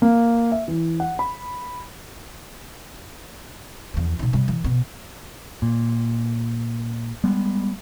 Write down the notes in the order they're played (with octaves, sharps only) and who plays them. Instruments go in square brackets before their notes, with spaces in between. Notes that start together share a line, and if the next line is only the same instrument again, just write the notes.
[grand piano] A#3
E5
E3
F#5
B5
[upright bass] E2 F3
B2 D#4
C3 G3
E3
B2 B3
[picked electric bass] A#2
G3 G#3 B3